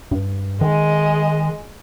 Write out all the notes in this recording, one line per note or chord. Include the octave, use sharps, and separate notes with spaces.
G2
D#3 G#3 D#5